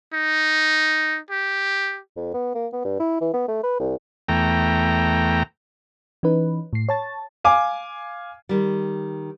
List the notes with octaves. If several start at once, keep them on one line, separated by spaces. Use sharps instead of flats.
D#4
G4
F2
B3
A#3
B3
G2
E4
E3
B3
A3
B4
C2
E2 A3 G5 A#5
E3 C#4 D#4 B4
A2 C7
C#5 A5 A6
F5 G#5 D6
D#3 G3